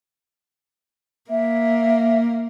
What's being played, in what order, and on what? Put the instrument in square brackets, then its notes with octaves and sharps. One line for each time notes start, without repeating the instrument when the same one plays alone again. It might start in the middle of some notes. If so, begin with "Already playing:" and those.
[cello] A#3 [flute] E5